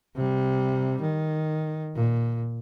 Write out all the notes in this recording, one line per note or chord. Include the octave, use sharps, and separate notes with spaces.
C3 G3
D#3
A#2